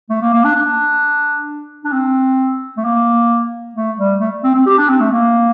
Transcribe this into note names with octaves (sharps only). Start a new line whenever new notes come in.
A3
A#3
A#3
D4
D4
D4
C4
A3
A#3
A3
G3
A3
C4
C4
G4
D4
C4
A3
A#3